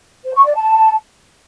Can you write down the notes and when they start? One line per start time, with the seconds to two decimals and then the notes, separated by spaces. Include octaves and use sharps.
0.24 C5
0.34 C#6
0.44 D5
0.54 A5